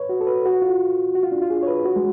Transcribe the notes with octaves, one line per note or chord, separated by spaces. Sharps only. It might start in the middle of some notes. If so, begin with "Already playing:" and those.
Already playing: B4 C#5
F#4
A4
B4
F#4
F4
F#4
F4
D4
F4
G#4
C#5
B4
F#4
G#3